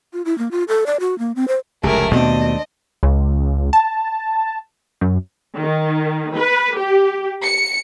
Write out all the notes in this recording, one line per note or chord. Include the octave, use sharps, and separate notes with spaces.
F4
E4
A#3
F4
A4
D5
F#4
A#3
C4
C5
F1 C#2 F#3 A3 G4 G#4 A#4
D#2 B2 A3 C4 D4 D#5
C#2
A5
F#2
D#3
B4
G4
C#7